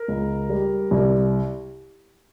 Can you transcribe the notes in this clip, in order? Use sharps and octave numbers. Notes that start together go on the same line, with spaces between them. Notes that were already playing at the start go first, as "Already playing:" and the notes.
Already playing: A#4
C#2
G3
C2